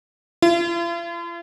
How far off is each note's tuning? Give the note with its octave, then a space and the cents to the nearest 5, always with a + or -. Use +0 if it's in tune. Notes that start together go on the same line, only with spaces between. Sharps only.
F4 -45